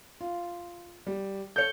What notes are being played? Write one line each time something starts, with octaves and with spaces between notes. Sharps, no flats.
F4
G3
A4 C#5 G6 C#7